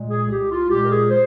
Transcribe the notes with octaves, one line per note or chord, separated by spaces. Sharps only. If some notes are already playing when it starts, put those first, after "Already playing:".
Already playing: A#2 G#3
G#4
C2 G4
F4
A#2 G#3 G4
A#4
G#4
C5